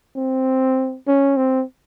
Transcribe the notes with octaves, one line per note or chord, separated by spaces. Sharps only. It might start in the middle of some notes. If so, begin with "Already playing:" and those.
C4
C#4
C4